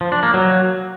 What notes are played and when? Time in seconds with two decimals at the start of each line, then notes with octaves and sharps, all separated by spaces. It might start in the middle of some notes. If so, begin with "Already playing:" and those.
0.01 F3
0.12 D4
0.23 A#3
0.34 F#3